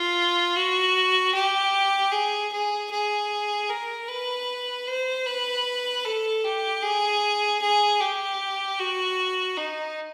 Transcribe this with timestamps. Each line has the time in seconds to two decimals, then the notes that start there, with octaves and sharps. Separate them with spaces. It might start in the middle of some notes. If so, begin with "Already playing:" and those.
Already playing: F4
0.56 F#4
1.35 G4
2.12 G#4
2.52 G#4
2.91 G#4
3.69 A#4
4.09 B4
4.88 C5
5.26 B4
6.05 A4
6.44 G4
6.83 G#4
7.62 G#4
8.01 G4
8.79 F#4
9.57 D#4